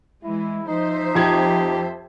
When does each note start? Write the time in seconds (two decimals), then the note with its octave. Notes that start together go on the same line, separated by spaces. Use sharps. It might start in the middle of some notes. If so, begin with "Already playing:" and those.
0.23 E3 G#3 E4
0.67 F3 D#4 C5 E5
1.15 F2 G4 G#6